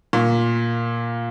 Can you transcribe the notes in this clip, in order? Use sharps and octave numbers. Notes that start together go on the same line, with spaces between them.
A#2